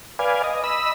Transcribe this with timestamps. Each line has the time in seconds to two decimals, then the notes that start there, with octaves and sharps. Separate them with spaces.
0.19 B4 D5 F5 G#5
0.44 D#5
0.64 D#5 B5 E6